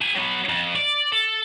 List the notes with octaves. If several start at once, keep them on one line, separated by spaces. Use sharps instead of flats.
G4 G#5
F#3 B3
F2
D5
A4